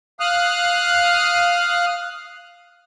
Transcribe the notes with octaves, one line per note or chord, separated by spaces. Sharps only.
F5 D#6 F6 F#6